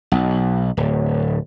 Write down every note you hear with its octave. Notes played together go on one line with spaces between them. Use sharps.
B1
D1